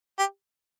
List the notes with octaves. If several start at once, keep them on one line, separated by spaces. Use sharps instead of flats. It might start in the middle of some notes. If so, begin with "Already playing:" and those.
G4